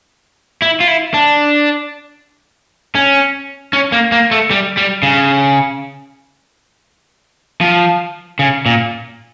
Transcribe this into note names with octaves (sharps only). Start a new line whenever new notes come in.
E4
F4
E4
D4
C#4
C#4
A#3
A#3
A3
G3
G3
C#3
F3
C#3
A#2